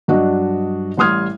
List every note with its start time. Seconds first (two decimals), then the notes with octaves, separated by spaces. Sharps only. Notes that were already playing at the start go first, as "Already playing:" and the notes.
0.08 G2 F#3 D4 F#4 D#5
0.97 A1 G3 C6 D#6 F6 G#6